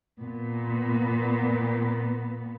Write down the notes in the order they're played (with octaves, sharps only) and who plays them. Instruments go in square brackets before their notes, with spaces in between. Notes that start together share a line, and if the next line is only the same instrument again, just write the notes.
[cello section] A#2 B3